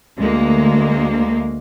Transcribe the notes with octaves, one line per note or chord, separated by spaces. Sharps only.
D2 G#3 A#3